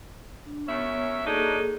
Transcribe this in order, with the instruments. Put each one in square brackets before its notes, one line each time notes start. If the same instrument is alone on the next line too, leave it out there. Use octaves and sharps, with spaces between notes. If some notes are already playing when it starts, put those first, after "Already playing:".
[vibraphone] D4
[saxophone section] F#2 C#4 E5 [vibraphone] B3 C#5
[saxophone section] F#3 D4 D#4 [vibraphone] A#3 G#4 A4